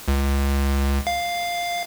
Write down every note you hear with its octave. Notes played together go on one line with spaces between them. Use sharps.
C#2
F5